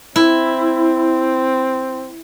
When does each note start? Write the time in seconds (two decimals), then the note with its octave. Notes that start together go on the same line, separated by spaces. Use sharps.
0.16 C4 E4